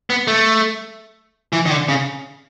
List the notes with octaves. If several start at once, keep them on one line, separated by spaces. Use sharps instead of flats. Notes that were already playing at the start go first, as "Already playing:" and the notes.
B3
A3
E3
D#3
D3
C#3